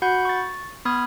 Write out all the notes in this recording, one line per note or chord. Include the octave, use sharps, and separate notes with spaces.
F#4 F#5 B5 G6
C#6 A6
B3 B5 D#6 F6 G#6